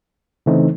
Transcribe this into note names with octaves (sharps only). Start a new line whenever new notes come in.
C#3 E3 A3 C4 D#4